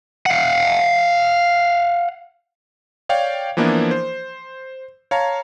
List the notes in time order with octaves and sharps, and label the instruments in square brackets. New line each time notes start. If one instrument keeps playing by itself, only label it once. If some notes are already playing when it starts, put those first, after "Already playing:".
[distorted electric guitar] F5 F#5
[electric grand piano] C#5 D5 F5 G5
E3 F3 A#3 B3 D4 E4
C5
C#5 F5 A5 A#5